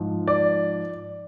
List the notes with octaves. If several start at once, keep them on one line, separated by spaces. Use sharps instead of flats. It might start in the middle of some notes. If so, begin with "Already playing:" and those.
Already playing: G#2 F3
D5